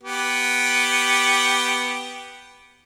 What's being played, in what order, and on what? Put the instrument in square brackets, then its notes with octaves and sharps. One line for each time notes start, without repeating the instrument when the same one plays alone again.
[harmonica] B3 G4